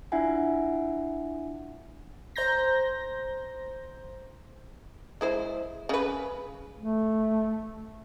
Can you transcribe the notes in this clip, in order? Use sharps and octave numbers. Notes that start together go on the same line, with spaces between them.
D4 E4 F4 E5 F#5 G#5
C5 A#5 G6 A#6
G#3 E4 C5
C#3 B4
A3